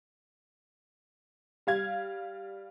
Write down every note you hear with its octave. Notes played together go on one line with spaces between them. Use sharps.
G3 F5 G#6